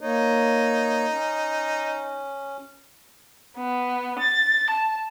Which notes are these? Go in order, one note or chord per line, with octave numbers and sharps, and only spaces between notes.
A#3 D#4 C#5
C#4
B3
A6
A5